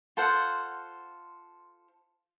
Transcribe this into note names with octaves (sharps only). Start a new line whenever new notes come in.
F4 A4 C5 F#5